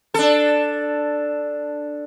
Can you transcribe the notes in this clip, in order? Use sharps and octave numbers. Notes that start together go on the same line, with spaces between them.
D4 A4